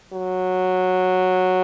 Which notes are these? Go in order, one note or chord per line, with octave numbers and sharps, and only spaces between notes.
F#3